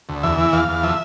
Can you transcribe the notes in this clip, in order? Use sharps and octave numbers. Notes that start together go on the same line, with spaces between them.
D2
E2 E5
E3
E2 F5
E2
F3 E5